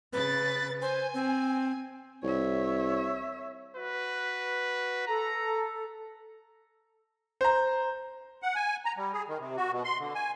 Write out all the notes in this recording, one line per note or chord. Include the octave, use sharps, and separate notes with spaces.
C#3 B4 A6
C5 G#5
C4
C2 C#5 E5
F#4 B4
A4 A#5
C5 A#5
F#5
G#5
A#5
G3
G#4
D#3
C3
F#4
B2
C6
D3
G#5